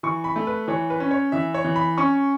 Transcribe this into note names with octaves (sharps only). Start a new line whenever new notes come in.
E3 C#6
B5
A3
B4
E3 C#5
B4
C#4
C#5
E3 E5
C#5
E3
B5
C#4 C#6